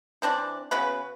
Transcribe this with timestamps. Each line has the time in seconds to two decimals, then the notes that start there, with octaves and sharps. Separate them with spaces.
0.22 E3 C4 D4 D5
0.71 C#3 B3 F#4 B4